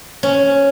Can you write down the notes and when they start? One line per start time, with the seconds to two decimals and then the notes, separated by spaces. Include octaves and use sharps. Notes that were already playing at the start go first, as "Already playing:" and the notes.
0.23 C#4